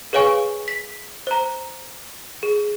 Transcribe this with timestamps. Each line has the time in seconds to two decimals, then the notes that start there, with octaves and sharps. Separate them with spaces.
0.13 G#4 B4 C#5 F5 G#5 C#6
0.68 B6
1.27 C5 A#5
2.43 G#4